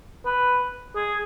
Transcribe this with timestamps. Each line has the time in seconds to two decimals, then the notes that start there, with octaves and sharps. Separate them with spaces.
0.25 B4
0.95 G#4